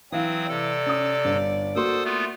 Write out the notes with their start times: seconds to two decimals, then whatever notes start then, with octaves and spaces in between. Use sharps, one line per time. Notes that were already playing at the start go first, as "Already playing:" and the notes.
0.12 E3 F#3 C4 F5 D#6
0.49 C3 A4 D5
0.86 C#4 D#6
1.25 G1
1.76 A#3 F#4 A4 C5 C6 D#6
2.04 A3 B3 F4